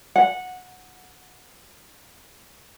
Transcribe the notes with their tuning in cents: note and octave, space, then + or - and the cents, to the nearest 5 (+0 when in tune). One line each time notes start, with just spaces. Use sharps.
F#5 -15